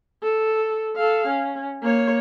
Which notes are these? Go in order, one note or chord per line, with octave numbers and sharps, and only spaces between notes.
A4
A4 F5
C#4
A#3 C#5